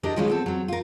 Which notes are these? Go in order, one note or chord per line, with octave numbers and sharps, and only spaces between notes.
D4 E4 G4 A#4 D5 D#5
D#3 F3 G#3 C#4 E4 F4
B3 C4 A4
F#3 C4
F4 A#4